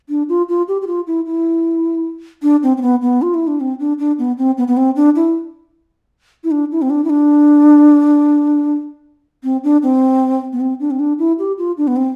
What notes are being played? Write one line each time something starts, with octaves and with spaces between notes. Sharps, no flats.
D4
F4
F4
G4
G4
F4
E4
E4
D4
C4
C4
B3
B3
F4
E4
D4
C4
D4
D4
B3
C4
B3
B3
C4
D4
E4
E4
D4
E4
C4
D4
E4
D4
C4
D4
C4
B3
C4
D4
C4
D4
E4
G4
F4
D4
B3
C4